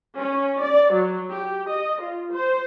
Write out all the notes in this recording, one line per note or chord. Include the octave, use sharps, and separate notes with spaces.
C#4
D5
F#3
G4
D#5
F4
C5